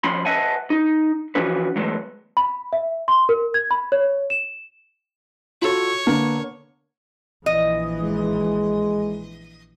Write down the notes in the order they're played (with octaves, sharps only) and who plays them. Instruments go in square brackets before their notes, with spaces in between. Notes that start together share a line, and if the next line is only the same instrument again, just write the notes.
[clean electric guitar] F2 F3 C#4 B5 C6
B4 D#5 E5 F#5 G#5 A5
D#4
E3 F3 C#4 F4 F#4 B4
E3 F#3 G#3 A3 B3
[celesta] B5
E5
C6
A#4
G#6
B5
C#5
E7
[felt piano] F4 F#4 A4 [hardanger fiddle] C#5
[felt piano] D3 A#3 B3
[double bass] A#1 E3 [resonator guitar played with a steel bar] D#5
[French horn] G#3